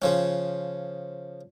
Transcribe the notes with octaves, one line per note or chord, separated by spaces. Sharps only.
C#3 F3 C#4